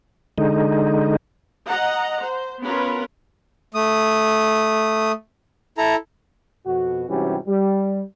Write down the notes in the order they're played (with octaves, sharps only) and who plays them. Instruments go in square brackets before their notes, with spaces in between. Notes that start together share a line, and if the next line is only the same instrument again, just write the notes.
[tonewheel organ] D3 G#3 D#4
[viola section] D#5 F#5 A#5
C5
B3 C#4 F4 A#4 B4
[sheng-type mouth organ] A3 D#6
E4 A4 A#5
[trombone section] F2 B2 F#4
G#2 C3 E3 G3 C#4 F#4
G3